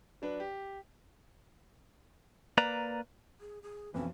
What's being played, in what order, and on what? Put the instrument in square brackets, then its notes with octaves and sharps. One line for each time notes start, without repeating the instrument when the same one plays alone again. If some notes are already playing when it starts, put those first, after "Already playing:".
[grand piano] F#3 D4 B4
G4
[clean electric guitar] A#3 B4 D5 A#5
[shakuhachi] G#4
G#4
[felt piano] B1 F2 [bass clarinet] E3 [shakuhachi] C#4